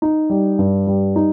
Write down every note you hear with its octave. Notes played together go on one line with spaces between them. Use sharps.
D#4
G3
G2
G3
D#4